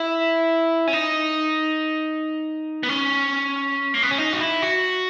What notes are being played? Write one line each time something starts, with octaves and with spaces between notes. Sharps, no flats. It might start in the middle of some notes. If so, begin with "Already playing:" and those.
Already playing: E4
C#4
D#4
B3
C#4
A#3
B3
C#4
D#4
F#4
E4
F#4